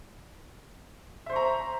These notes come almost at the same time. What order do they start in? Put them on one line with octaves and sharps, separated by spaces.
E5 C5 C#6 A#5